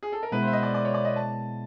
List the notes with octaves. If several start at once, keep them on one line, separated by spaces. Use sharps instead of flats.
G#4
A4
A#4
B2 G#3 B3 E4 B4
C5 E5
D#5
D5
D5
C#5
D5
D#5
A5